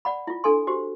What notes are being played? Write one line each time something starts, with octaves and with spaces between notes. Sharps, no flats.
D5 F#5 B5
E4 F4
D4 A4 G#5 C6
F#4 G4 C5